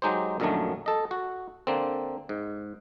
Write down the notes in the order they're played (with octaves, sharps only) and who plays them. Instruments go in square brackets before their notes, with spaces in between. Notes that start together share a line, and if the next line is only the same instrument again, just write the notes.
[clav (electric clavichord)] F#3 G#3 D#4 G4 C5
A#1 F#2 D3 D#3 F#3 A3
A4 D#5
F#4
D3 A#3 C4
G#2